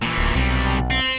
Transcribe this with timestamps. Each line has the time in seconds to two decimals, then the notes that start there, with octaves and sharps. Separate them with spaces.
0.02 A#2 E3
0.18 D1
0.35 B1 C3 G3
0.90 C4